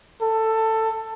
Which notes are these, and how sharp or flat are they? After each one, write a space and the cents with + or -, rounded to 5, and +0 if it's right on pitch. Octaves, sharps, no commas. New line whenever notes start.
A4 +15